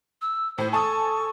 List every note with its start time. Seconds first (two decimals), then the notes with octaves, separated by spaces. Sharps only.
0.22 E6
0.58 A2 E4 C5
0.73 A4 G#5 A5 C#6 D#6